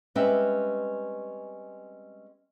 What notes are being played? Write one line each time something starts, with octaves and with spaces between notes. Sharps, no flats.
G3 G#3 C4 C#4 B4 E5